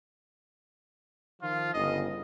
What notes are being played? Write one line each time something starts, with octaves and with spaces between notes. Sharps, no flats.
D#3 F3 F4
G1 C#2 D#5